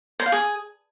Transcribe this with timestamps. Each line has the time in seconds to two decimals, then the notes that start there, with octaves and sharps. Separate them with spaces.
0.20 C5
0.26 F5
0.32 G#4